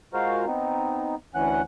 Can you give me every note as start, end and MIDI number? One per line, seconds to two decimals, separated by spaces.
0.14 0.45 56
0.14 0.45 65
0.14 0.45 66
0.14 0.45 70
0.14 0.45 72
0.14 0.45 77
0.46 1.15 59
0.46 1.15 60
0.46 1.15 63
1.35 1.62 38
1.35 1.62 52
1.35 1.62 61
1.35 1.62 78
1.35 1.62 90